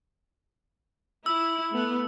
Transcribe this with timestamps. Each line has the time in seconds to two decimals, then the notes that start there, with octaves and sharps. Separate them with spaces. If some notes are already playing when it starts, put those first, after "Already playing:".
1.26 E4 E6
1.71 A3 B3